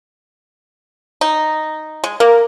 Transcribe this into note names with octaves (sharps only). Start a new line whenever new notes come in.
D#4
G#3
A#3 A#4